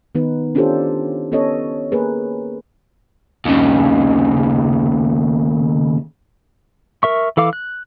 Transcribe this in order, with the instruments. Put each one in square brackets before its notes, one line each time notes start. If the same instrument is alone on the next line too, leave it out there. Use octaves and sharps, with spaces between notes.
[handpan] D#3 B3 D#4 B4
C#4 D4 F4 G4 A4 C5
B3 C#4 A4 C#5 D#5
A#3 G#4 A#4 B4
[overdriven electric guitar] D#2 C#3
[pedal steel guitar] A#4 E5 C#6
E3 A4 F5 D6
F#6